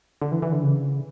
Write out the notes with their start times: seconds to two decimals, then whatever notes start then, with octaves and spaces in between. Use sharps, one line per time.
0.22 D3
0.32 E3
0.42 E3
0.53 D3
0.63 C#3